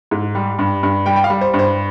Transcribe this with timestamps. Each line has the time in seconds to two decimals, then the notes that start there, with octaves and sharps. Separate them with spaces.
0.11 G#2
0.35 G3
0.59 G2
0.83 G2
1.06 G3 G5
1.16 G5
1.24 F5
1.30 G3
1.41 C5
1.54 G2
1.59 C5